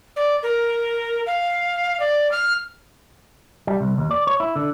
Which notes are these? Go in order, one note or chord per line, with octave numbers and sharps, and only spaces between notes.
D5
A#4
F5
D5
F6
G3
C2
D#2
D5
C#5
E4
D3